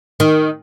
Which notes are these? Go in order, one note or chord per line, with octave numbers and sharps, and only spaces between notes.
D#3